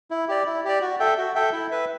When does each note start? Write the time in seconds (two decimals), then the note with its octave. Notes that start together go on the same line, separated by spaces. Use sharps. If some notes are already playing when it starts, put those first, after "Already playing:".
0.11 E4
0.28 G4 D5
0.46 E4
0.65 G4 D5
0.81 F#4
1.00 A4 E5 G5
1.18 F#4
1.35 A4 E5 G5
1.53 E4
1.71 B4 E5